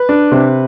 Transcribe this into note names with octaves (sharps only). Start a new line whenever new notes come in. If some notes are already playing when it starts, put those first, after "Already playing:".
Already playing: B4
D4
C3